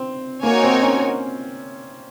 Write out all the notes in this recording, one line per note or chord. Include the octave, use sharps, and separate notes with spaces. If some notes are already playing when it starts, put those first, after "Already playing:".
Already playing: C4
A#3 D#4 F#4 A#4 C#5 G#5
C4
C#4